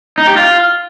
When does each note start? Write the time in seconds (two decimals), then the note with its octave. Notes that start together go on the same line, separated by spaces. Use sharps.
0.18 D#4
0.27 G4
0.37 F4